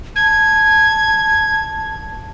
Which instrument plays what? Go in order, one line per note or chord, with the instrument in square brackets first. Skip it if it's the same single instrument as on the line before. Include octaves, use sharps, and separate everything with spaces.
[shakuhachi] A5 [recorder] G#6